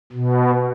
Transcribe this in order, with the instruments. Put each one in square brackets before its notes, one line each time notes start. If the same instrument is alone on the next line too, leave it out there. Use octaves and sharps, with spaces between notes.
[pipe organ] B2